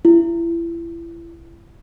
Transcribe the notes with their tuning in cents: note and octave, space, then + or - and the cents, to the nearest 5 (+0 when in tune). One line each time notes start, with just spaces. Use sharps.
E4 +30